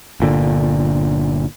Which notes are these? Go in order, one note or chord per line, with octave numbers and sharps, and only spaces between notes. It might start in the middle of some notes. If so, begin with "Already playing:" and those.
G1 A#2 D3